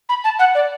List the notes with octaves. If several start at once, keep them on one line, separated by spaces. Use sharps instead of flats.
B5
A5
F#5
D5